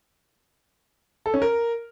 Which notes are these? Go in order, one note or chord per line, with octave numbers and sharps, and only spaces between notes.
A4
C#4
A#4